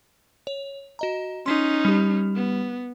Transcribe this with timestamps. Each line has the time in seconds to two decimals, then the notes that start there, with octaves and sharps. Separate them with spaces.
0.47 C#5
0.99 F#4 D#5 A#5
1.46 C#4 D#4 C6 B6 C7
1.85 G3 G4
2.36 B3